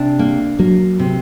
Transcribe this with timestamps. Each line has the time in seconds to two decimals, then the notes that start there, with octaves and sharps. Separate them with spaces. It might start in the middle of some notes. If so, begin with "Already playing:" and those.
Already playing: C3 D4
0.19 A#3
0.59 F#3 A#3
0.99 C3